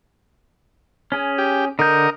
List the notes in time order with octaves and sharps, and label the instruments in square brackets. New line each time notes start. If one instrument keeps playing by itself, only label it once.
[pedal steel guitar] C#4 G#4
[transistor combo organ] G4
[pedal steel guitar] D3 G6 [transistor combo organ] A#4 D#5